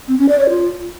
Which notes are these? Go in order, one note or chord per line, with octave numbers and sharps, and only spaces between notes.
C4
C#4
D5
C#5
F4